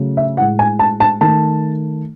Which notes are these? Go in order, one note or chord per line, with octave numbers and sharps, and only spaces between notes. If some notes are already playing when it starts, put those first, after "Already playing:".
Already playing: C#3 F#3 A3
E5
A2 G#3 F#5
G#5
A5
A5
D#3 A3 A5